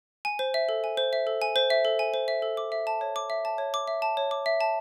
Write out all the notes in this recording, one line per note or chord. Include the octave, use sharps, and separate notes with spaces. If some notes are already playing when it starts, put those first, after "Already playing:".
G#5
C5
E5
A4
G#5
C5
E5
A4
G#5
C5
E5
A4
G#5
C5
E5
A4
D6
E5
A5
C#5
D6
E5
A5
C#5
D6
E5
A5
C#5
D6
E5
A5